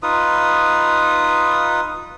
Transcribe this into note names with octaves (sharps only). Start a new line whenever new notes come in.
D#4 F4 B4 D#6